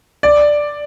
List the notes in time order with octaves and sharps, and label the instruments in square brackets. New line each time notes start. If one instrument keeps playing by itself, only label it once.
[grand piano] D5